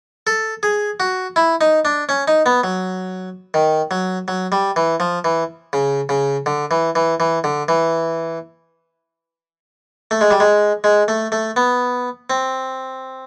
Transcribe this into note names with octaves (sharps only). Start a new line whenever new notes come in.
A4
G#4
F#4
E4
D#4
D4
C#4
D#4
B3
F#3
D#3
F#3
F#3
G3
E3
F3
E3
C#3
C#3
D3
E3
E3
E3
D3
E3
A3
G#3
G3
G#3
G#3
A3
A3
B3
C4